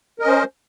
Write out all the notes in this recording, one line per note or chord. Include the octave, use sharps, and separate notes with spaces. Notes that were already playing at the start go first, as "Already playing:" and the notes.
C#4 A#4 C5 D#5